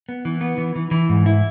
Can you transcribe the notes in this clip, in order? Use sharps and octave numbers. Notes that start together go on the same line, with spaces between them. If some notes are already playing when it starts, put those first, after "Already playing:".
B3
E3
B3
E3
E3
E3
G#2
E4